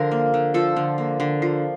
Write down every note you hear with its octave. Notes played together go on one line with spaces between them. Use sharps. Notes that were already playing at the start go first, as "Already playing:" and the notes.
Already playing: D3 F3 A#4
A#3
D3
F3 A4
D3
A#3
D3
F3